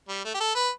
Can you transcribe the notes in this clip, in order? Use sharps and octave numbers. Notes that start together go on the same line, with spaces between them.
G3
A3
G4
A4
B4